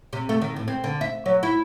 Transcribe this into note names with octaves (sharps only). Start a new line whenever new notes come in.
C3
A3
D#3
A2
C4
D3
E5
F#3
E4